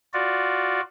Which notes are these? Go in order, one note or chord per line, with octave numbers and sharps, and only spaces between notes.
F4 F#4 D5